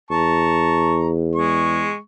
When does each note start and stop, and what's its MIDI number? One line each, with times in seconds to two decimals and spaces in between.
0.11 1.88 40
0.11 1.09 81
0.11 1.09 82
0.11 1.09 85
1.35 1.97 56
1.35 1.97 85